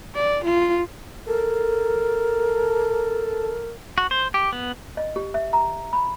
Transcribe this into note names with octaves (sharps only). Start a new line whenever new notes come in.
D5
F4
A4 A#4
F#4
C5
G4
B3
D#5
G4
E5
A#5
B5